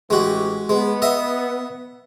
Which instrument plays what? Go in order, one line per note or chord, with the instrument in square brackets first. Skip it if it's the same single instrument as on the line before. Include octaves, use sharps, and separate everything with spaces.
[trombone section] A1 E3 G4 [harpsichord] G#3 F#4
[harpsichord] G#3 [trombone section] B3
[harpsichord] D#5 E5